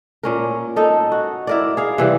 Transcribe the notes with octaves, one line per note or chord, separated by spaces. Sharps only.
A#2 C#4 A#4
D#4 A4
F#4
E4 A#4 D5
G#4 F5
C3 E3 G3